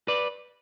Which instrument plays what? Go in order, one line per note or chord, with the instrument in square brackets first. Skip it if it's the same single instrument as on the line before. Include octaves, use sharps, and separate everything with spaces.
[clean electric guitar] B4 D5